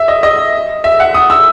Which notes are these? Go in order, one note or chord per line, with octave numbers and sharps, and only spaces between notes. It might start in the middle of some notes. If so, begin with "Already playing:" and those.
Already playing: E5
D#5
D#5
E5
F#5
D#6
E6